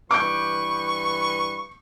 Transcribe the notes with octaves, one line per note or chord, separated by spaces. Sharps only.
G2 E3 B4 C#6 D6 G6